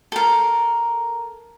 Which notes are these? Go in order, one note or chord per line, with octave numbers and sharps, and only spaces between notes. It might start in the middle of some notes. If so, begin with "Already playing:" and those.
A4 A#4